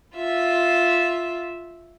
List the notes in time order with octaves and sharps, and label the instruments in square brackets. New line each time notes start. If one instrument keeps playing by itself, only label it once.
[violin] F4 E5